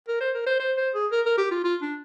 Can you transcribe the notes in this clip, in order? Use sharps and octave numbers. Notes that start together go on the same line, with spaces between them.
A#4
C5
A#4
C5
C5
C5
G#4
A#4
A#4
G4
F4
F4
D4